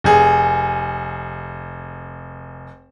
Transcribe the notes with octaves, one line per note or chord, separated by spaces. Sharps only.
F1 G#4